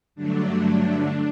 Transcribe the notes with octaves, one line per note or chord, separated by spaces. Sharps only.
G2 D3 F#3 A3 D4